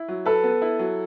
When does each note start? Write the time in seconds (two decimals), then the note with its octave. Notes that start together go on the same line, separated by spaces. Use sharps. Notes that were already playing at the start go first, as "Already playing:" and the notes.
Already playing: E4
0.08 F#3
0.26 A4 B4
0.44 B3
0.62 E4
0.79 F#3